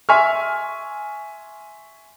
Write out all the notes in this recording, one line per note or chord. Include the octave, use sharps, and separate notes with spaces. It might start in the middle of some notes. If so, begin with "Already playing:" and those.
E5 G#5 C6 C#6 F6